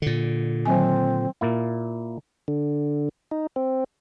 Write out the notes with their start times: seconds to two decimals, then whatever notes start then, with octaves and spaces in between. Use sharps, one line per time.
0.02 A#2 D3
0.66 D#3 F#3 C4 G#5
1.41 A#2 A#3 E4
2.48 D3
3.31 D#4
3.56 C4